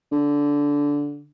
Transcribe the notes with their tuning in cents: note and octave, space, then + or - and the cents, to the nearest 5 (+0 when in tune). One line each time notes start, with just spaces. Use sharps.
D3 -15